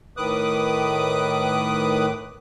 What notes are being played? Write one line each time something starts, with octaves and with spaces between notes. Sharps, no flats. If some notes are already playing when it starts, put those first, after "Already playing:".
A2 D#3 B4 D6 D#6 F#6